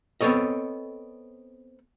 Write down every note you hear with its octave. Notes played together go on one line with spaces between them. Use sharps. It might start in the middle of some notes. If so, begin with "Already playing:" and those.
B3 C4 A4 C#5 D#5